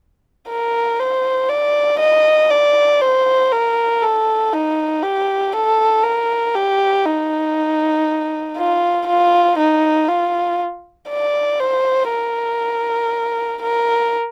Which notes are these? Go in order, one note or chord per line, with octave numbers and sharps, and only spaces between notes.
A#4
C5
D5
D#5
D5
C5
A#4
A4
D#4
G4
A4
A#4
G4
D#4
F4
F4
D#4
F4
D5
C5
A#4
A#4